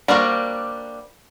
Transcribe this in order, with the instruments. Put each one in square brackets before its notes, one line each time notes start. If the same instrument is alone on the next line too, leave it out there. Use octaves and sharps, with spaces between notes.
[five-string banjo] G3 A#3 D4 F#4 C5